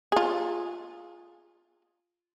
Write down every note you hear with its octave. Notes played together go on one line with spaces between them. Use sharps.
F4 G#4